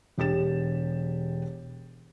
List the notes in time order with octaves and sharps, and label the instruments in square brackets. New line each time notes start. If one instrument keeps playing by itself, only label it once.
[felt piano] E1 G4 A6 E7